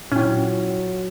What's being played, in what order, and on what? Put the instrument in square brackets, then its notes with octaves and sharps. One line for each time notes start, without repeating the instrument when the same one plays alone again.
[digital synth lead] A#2 [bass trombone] F#3 [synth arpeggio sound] C#4 [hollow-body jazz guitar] E4 G5